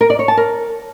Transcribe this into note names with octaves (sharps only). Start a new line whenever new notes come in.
A#4
D5
C#5
A5
A#4